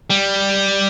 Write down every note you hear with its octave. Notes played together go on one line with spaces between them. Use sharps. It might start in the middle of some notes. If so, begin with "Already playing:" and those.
G3